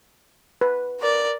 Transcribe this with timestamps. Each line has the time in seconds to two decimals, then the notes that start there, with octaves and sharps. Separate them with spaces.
0.61 B4
1.00 A#4 D5